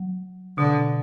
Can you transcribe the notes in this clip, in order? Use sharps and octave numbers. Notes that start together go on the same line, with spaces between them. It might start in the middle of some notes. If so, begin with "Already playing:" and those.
Already playing: F#3
B2 D3